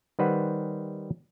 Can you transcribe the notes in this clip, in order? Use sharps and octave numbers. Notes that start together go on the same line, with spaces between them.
D#3 G3 B4 C5 F#5